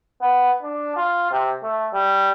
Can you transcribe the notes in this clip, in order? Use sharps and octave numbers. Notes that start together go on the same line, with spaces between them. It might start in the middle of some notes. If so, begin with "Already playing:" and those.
B3
D4
F4
C3
A3
G3